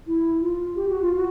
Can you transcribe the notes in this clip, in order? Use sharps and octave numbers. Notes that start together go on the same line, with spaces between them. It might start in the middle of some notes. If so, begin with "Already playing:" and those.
E4
F4
G4
F#4
F4
F#4